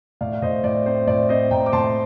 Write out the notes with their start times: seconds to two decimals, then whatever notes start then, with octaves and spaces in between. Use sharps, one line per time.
0.21 A2 D5 F5
0.34 F5
0.42 A2 C5 D#5
0.64 A2 D5
0.86 C4 C5
1.07 A2 D5
1.29 C4 C5 D#5
1.51 A2 G5 A#5
1.66 D6
1.72 A2 A5 C6